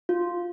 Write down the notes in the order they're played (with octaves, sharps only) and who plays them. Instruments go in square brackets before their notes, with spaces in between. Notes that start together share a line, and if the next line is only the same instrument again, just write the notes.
[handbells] F4